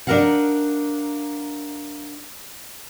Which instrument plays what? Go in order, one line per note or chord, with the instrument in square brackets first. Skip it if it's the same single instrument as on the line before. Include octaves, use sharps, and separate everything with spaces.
[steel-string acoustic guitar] D4 D#4 A4 A#4 F5 F#5